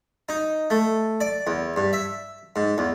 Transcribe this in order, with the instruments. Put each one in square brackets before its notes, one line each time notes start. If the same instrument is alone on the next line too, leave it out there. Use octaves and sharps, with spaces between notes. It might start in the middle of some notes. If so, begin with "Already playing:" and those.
[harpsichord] D#4
A3
D5
E2
G2
E5
G#2
E2